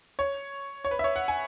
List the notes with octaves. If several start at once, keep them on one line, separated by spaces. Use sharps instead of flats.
C#5
C#5
B4
E5
C#5
F#5
G#5